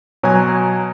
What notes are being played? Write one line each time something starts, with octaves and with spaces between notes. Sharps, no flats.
B2 F#3 C#5 G#5 A#5 C6